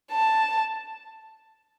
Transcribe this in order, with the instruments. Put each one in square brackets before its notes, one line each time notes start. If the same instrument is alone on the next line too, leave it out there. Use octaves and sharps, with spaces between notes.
[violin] A5